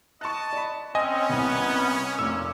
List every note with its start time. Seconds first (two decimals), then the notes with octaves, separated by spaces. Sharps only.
0.21 D#5 A5 C#6 F#6
0.53 D5 B5
0.95 C4 C#4 D#5 G#5
1.29 C2 C3 B3
2.19 F1 A#2 D6 E6